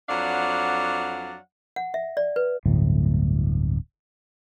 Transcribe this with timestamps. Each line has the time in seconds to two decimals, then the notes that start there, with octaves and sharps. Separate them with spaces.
0.08 F2 F#3 D4 D5 F5 F#5
1.76 F#5
1.94 E5
2.17 D5
2.36 B4
2.66 D1 G1 A2